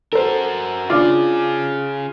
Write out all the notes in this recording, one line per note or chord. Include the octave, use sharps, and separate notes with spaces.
F#4 A4 A#4 C5
C#4 D4 F4 G#4 D5 D6